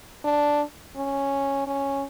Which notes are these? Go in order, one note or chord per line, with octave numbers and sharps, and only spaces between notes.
D4
C#4
C#4